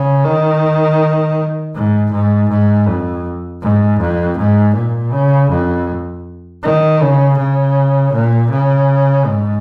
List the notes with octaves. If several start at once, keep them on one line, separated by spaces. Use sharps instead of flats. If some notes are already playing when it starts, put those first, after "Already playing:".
Already playing: C#3
D#3
G#2
G#2
G#2
F2
G#2
F2
G#2
A#2
C#3
F2
D#3
C#3
C#3
A#2
C#3
G#2